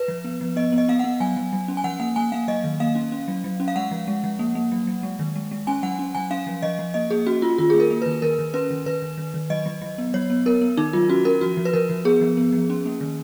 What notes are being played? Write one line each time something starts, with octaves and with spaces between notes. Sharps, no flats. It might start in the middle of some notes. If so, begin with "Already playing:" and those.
Already playing: B4
F3
B3
F3
B3 D#5
B3
D#5
B3 F5
B3 F#5
F#3 G#5
F#3
F#3
C#4
G#5
F3 F#5
A#3 F#5
A#3 G#5
A#3 F5
F#3 D#5
D#3
A#3 F5
C#4
C#4
F#3
F#3
C#4
F5
G#3 F#5
F3
G#3
F3
A#3
A#3
F#3
F#3
G#3
D#3
G#3
G#3
C#4 G#5
F#3 F#5
C#4
F#3 G#5
C#4 F5
F3
F3 D#5
F3
A#3 D#5
A#3 G#4
C#4 F#4
C#4 F4
D#3 F4
A#3 G#4
A#4
A#3
D#3 B4
D#3 A#4
D#3
C#4 B4
D#3
D#3 B4
D#3
D#3
D#3
F#3 D#5
F#3
F#3
B3
F#3 C#5
B3
B3 A#4
B3
D#3 D#4
F#3 F4
C#4 F#4
C#4 A#4
F3 F#4
F3
B4
F3 A#4
F3
B3 G#4
F3
B3
F3
C#4
A#3
D#3